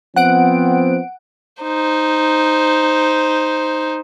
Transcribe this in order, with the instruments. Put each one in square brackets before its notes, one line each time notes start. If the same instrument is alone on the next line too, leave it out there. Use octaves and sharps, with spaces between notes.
[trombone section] F3 B3 C4 [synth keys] F#5 D7
[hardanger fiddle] D#4 C5